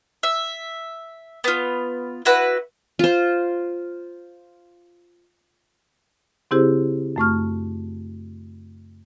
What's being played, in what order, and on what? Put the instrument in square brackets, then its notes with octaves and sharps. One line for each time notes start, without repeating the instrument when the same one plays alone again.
[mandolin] E5
B3 F4
E4 F#4 B4
[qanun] F4 C5
[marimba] C#3 C4 E4 G4 G#4 C5
F#2 A3 C#6 F6